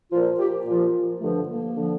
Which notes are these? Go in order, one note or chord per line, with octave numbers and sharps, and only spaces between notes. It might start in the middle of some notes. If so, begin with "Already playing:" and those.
A#2 F3 F4
G4
A#2 F3 F4
G2 D3 F3 A3
A#3
D3 F3